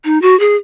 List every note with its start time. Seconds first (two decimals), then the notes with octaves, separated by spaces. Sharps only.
0.05 D#4
0.22 F#4
0.40 G#4